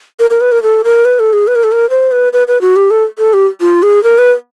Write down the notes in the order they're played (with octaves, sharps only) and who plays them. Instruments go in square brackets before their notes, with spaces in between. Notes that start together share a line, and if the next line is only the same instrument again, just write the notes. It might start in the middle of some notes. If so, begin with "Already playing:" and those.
[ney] A#4
A#4
B4
A#4
A4
A#4
B4
A4
G#4
B4
A#4
A4
A#4
C5
B4
B4
B4
F#4
G4
A4
A4
G4
F4
G#4
A#4
B4